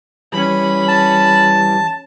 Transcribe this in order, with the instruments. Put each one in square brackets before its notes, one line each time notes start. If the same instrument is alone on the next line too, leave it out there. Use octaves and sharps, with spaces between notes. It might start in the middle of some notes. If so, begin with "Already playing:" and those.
[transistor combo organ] E3 G3 [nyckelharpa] C#4 B5
[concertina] A5